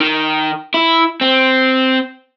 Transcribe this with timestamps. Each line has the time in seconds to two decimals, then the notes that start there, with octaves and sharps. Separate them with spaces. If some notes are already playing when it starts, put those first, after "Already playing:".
0.01 D#3
0.74 E4
1.21 C4